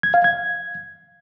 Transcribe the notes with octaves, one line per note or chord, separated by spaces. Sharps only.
G#6
F5
G#6